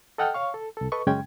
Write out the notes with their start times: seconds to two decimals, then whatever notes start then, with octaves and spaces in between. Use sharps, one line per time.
0.18 A4 D#5 F#5 G5 F6
0.34 C#5 F5 C#6
0.54 A4
0.77 C2 A4
0.92 A4 B4 D#5 C#6
1.07 F#2 C#3 G#3 C#4 G5 G#6